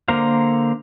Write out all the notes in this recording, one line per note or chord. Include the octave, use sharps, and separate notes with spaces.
D3 A#3 A#4 C5 F5